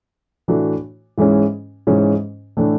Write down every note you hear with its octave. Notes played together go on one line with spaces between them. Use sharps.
A2 E3 A3 D4 F#4
G#2 E3 G#3 C#4
G#2 E3 G#3 C#4
A2 E3 A3 D4